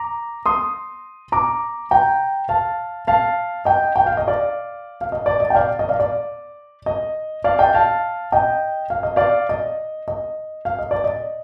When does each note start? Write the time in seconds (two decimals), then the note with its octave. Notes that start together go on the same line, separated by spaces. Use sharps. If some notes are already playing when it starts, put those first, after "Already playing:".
Already playing: A#5 D6
0.46 C6 D#6
1.32 A#5 D6
1.91 G5 A#5
2.49 F5 A5
3.07 F5 A5
3.65 D#5 G5
3.96 G5
4.06 F5
4.17 D#5
4.27 D5 F5
5.01 F5
5.12 D#5
5.26 D5
5.40 D#5
5.50 G5
5.55 D5 F5
5.79 D#5
5.89 D5 F5
6.00 D5
6.86 D#5
7.44 D5 F5
7.59 D#5 G5
7.74 F5 A5
8.32 D#5 G5
8.90 F5
9.03 D#5
9.16 D5 F5
9.49 D#5
10.08 D#5
10.65 F5
10.79 D#5
10.91 D5
11.04 D#5